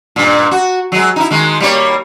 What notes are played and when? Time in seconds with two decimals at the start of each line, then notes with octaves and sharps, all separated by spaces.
0.16 G2 A#2
0.51 F#4
0.92 F#3 G#3
1.16 D#4 E4
1.31 D#3 G#3
1.60 G3 A#3 C#5